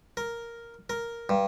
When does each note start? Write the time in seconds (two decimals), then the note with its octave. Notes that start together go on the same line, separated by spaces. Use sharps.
0.17 A#4
0.90 A#4
1.29 G2